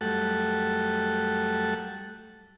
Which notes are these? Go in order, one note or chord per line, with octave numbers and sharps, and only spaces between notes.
F#2 G3 A3 A4 F#5